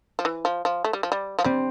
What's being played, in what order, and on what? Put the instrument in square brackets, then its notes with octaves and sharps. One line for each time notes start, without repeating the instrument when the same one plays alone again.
[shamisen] F3
E3
F3
F3
A3
G3
F3
G3
F3
[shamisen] G3 [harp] C4